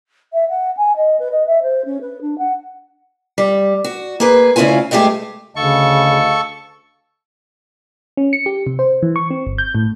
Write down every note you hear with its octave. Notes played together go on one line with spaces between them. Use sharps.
E5
F#5
G#5
D#5
B4
D#5
E5
C5
C#4
B4
D4
F#5
G3
F#4
A#3 G#4 B4
D2 C#3 C#4 E4 F4 G#5
G2 G#3 A3 G4 G#4
D2 C#3 A4 D#5 F5 C#6
C#4
C#7
G4
C3
C5
E3
C#6
C4
G1
G6
A2